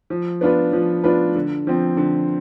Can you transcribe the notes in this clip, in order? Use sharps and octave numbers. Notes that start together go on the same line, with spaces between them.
F3
B3 D4 F4 B4
F3
B3 D4 F4 B4
D3
F3 C4
D3